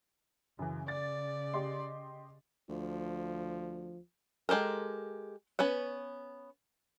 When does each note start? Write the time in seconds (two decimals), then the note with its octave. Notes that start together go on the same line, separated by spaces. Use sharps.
0.59 F#2 C#3 E3
0.88 D5 A6
1.53 G4 D#5 C6
2.69 D2 F3
4.49 G#3 G4 A4 A#4
5.59 B3 C#4 B4 F#5